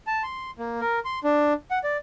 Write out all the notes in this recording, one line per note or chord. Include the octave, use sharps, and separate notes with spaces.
A5
C6
A#3
A#4
C6
D4
F#5
D5